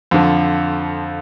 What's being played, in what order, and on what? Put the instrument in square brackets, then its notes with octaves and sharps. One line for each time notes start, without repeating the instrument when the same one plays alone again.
[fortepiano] F2 D3 F3